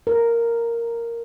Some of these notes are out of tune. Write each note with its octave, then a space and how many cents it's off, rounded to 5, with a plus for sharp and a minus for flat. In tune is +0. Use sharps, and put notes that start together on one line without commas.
A#4 -5